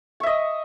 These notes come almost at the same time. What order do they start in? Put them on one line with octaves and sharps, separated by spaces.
C#6 E5 D#5